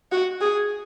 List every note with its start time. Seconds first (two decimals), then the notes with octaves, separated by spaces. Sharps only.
0.12 F#4
0.41 G#4